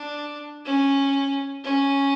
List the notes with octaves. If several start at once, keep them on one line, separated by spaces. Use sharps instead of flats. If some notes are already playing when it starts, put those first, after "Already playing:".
Already playing: D4
C#4
C#4